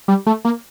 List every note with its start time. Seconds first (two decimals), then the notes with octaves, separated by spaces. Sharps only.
0.08 G3
0.27 A3
0.45 A#3